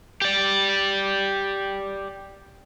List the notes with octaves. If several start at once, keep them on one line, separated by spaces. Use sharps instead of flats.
G4 D5